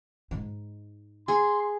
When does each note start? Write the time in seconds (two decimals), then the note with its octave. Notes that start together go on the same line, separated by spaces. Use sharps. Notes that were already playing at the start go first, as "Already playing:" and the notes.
0.31 G#2 D#4
1.28 G#4 C6